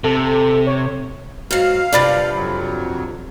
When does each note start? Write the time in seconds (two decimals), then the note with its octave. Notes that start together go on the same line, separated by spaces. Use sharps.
0.04 C3 A4
0.67 C#5
1.51 G#2 F#3 F5
1.93 G2 C3 F3 D5 B5 A6
2.35 F2 F#3